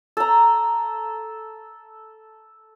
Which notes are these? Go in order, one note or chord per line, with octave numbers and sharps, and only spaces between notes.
A4 A#5